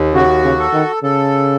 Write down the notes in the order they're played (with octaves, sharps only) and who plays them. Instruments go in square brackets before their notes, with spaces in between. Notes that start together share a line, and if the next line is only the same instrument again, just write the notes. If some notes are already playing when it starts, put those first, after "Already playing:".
Already playing: [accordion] D#2
[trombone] C#3 [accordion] F#4
[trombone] C#3
[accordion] A4
[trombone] D#3
[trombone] C#3 [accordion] A4